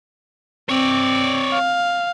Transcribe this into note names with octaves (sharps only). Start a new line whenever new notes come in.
C4 C#5 D5
F5